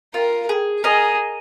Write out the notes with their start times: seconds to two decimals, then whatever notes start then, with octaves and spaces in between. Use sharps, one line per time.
0.14 F4 A#4
0.49 G#4
0.84 G#4 A#4 D#5